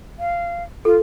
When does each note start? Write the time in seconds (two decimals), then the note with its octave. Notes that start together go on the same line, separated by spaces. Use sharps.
0.19 F5
0.85 F4 A4